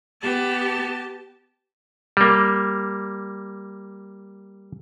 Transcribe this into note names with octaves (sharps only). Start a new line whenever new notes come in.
B3 G4 A5
G3 A#3